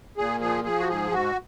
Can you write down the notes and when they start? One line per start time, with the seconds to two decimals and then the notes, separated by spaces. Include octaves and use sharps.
0.17 A#2 G#4
0.41 F3 G#4
0.64 F3 G#4
0.80 F#4
0.88 G#2 G#4
1.11 G#2 F#4